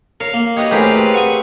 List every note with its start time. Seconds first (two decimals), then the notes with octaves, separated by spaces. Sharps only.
0.20 A#4 C#5 F5
0.34 A#3
0.57 F#4 G4 B4 C#5 D#5
0.71 A2 C4 G4 G#4 A#4 B4
0.83 F5
1.14 F#5 C#6 D#6